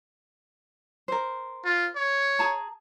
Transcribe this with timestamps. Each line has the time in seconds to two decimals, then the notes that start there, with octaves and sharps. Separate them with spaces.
1.08 A#4 C5
1.65 F4
1.96 C#5
2.39 G#4 A5 A#5